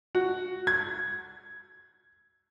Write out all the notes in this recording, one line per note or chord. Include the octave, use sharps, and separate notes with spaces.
F#4
G#6